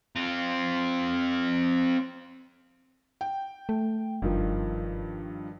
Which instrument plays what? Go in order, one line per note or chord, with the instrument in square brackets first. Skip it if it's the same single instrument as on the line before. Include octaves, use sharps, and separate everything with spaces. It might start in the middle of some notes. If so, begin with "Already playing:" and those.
[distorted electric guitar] C4 F4
[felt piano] G5
[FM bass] A3
[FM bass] F#1 [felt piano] G2 D#3 F3